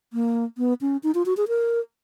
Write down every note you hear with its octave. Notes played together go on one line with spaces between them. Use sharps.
A#3
B3
C#4
D#4
F4
F#4
G#4
A#4